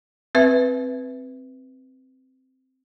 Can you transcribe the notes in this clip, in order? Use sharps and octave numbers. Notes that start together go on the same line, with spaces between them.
C4 B4 E5